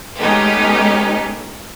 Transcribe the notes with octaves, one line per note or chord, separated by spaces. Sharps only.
G#3 A3 B3 C#4 D#4 G4